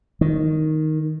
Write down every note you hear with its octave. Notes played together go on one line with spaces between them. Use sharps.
D#3